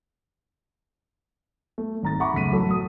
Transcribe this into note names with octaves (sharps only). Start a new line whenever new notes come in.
A3
G#1 A#5 A6
E5 F#5 A#5 B5 C#6 D6
C#2 F#2 A3 B6 D#7
A1 F#3 A4
D#6